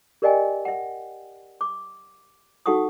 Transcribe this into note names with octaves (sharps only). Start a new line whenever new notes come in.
G4 A#4 D5 D#5 G5 G#5
E5 F#5
D6
D#4 F#4 A4 F#5 C#6 D#6